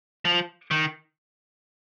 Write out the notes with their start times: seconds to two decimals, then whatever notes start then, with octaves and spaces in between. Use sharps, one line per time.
0.25 F3
0.71 D#3